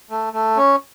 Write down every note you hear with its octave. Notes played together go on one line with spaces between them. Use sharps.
A3
A3
C#4